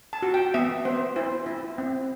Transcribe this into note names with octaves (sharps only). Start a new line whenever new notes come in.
A5
F#4
G5
B3 E5
B3 C5
E4 C5
E4
C4